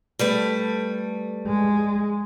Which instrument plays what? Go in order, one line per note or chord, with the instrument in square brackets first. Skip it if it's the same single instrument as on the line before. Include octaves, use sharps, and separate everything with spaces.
[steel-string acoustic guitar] G3 A3 B4
[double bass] G#3